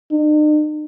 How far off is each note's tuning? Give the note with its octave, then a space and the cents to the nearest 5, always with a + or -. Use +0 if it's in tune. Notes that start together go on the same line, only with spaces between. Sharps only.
D#4 -45